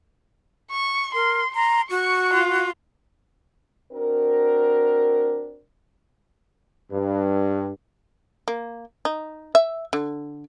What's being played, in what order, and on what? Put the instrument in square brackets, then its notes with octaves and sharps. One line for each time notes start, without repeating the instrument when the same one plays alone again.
[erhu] C#6
[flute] A#4 [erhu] C6
[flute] A#5 [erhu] C6
[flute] F#4 [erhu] C#6
[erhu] F4
[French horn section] C4 D4 F#4 A#4
[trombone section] G2
[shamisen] A#3
D#4
E5
D3